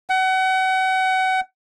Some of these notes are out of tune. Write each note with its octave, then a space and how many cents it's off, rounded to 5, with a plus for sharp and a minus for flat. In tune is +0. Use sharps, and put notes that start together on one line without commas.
F#5 +30